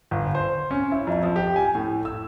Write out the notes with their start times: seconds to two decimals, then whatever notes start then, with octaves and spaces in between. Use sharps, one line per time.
0.11 G1
0.35 C5
0.71 C#4
0.92 E4
1.07 F2
1.23 F3
1.36 G4
1.56 G#5
1.75 A2
2.05 E6